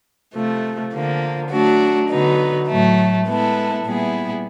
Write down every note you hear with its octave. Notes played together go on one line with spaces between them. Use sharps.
C3 F3 A3
D3 F3 A#3
F#3 A3 D4 F#4
D3 F#3 B3 D#4
A2 F#3 A3
G#3 B3 E4 A4
A#2 G3 B3 E4 G#4